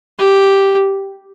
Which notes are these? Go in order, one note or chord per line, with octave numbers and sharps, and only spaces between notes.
G4